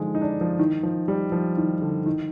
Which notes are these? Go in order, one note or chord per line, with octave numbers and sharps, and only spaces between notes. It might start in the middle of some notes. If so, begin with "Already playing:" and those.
Already playing: D3 D#3 F3 G#3
D#4
D4
F3
D#3
F3
G3
F3
D#3
D3
D#3